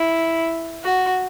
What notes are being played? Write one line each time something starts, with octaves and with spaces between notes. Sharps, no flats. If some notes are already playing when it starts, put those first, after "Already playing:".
Already playing: E4
F#4